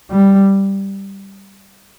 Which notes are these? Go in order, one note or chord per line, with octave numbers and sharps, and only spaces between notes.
G3